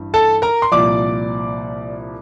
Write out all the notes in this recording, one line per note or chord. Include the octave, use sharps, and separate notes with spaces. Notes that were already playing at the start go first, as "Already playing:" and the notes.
Already playing: A1 G2
A4 A5
A#4 A#5
C6
C2 A#2 F3 D5 D6